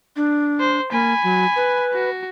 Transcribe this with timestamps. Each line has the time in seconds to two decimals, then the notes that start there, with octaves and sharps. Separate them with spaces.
0.16 D4
0.60 C5
0.92 A#3 G#5 B5
1.23 F#3
1.56 B4
1.94 F#4